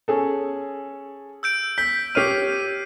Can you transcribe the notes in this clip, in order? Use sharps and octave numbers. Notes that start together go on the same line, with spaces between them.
C#4 G#4 A4
E6 G6 D7
G6 B6
G4 C#5 F6 B6 C7 D#7